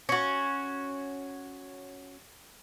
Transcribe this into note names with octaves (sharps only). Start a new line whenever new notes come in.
C#4 F#4